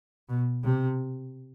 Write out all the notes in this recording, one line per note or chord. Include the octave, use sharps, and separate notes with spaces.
B2
C3